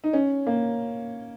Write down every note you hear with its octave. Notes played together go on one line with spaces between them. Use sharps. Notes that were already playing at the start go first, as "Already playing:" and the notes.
D#4
C#4
A#3